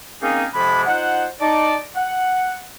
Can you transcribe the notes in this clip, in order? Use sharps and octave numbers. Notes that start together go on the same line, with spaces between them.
A#3 C4 C#4 D#4 G#4
F2 C3 F3 G#3 D4 B5
D#4 F4 C5 F#5
D#4 D5 A5
F#5